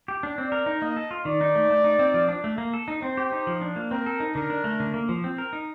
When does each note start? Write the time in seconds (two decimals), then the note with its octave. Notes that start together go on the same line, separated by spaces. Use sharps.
0.08 G4
0.23 D4
0.38 C4 D5
0.52 A#4
0.66 D#4
0.81 A#3 D#5
0.97 A4
1.11 F4
1.25 D#3 D5
1.41 D#4
1.55 A3
1.70 A3
1.84 D#4
1.99 C4
2.14 F3
2.29 D4
2.44 A3
2.58 A#3
2.74 A4
2.88 D#4
3.02 C4 C5
3.17 G4
3.32 D#4
3.47 F3
3.61 D4
3.76 A#3
3.91 C4 A#4
4.06 A4
4.20 D#4
4.35 D3 A#4
4.50 D4
4.64 A3
4.80 D3
4.94 A#3
5.09 F3
5.24 C4
5.38 A#4
5.53 D#4